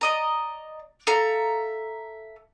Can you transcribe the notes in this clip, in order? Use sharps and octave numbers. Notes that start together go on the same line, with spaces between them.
D5 D#5 A#5
A4 E5 F5 A#5